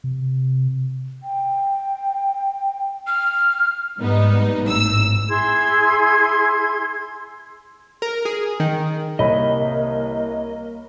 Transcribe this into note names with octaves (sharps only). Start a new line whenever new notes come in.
C3
G5
F6
G#2 G3 B3 D#4
G#1 A2 E6
E4 G#4 C6 G#6
A#4
G#4
D#3
C2 A#3 C#5 D#5 B5